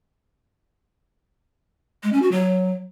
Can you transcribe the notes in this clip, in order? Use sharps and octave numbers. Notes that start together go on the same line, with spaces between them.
G#3
C#4
F#4
F#3